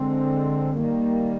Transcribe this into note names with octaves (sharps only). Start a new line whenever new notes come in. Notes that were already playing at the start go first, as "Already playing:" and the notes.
Already playing: D3 G#3 C4
D#3 G3 A#3